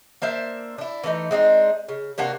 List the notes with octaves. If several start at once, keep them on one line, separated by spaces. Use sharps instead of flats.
A#3 D4 C5 E5
D4 E4
E3 A3 A#3 D#4
G#3 C4 D4 D#4
C#3
C3 A#3 D4 F#4